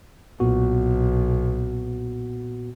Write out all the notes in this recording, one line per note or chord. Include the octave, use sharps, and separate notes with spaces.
B1 A#2 B3 F#4